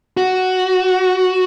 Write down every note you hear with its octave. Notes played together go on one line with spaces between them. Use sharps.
F#4